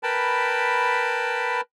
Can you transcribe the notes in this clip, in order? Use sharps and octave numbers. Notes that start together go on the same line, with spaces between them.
A#4 B4 G5 A5 B5